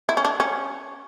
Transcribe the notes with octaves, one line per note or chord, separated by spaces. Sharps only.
E4
C#4
D4
C#4